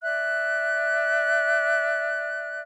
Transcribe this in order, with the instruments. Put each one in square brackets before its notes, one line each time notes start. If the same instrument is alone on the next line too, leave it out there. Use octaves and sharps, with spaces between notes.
[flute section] D5 E5 F#6